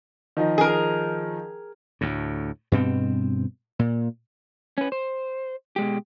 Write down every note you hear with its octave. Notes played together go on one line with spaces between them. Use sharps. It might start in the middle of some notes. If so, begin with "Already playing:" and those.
D#3 F3 D#4
G#4 A#4
D2 A2
G2 B2 C4
A#2
C#4 B4
C5
B2 G#3 G4